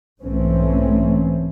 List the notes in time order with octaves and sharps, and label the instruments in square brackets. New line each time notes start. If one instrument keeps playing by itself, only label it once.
[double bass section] B1 G#2 E3 A3 C4 C#4